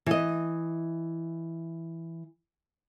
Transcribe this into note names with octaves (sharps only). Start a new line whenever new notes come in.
E3 D#5